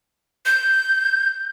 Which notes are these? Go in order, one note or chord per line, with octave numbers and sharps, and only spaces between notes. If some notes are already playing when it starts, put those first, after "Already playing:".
G6